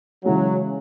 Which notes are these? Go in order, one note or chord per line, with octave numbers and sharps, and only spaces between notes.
C#3 E3 F#3 G#3 C#4